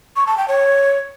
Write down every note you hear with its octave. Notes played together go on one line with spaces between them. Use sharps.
C#6
A5
G5
C#5